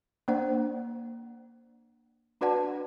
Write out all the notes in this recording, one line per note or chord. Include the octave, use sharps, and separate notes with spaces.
A#3 D4 C5 D5 F#5
D4 F#4 B4 D5 F#5 A5